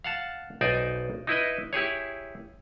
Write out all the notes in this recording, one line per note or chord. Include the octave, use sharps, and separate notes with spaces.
F5 F#5 A5
B1 D#4 C5 D5 G#5
D#4 E4 B4 D#5
E4 G4 G#4 C#5